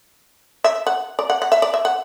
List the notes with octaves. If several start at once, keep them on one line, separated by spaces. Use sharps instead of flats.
E5
F#5
D5
F#5
F#5
E5
D5
E5
F#5